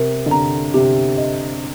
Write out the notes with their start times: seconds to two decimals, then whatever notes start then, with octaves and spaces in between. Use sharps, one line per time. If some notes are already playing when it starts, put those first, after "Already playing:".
Already playing: C3 A#4
0.26 D3
0.31 C3 A#5
0.74 C3 G4
1.17 D#5